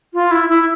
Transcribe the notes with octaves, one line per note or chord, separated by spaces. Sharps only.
F4
E4
E4